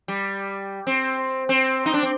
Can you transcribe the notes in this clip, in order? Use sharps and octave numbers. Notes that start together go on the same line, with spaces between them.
G3
C4
C4
D#4
D4
C4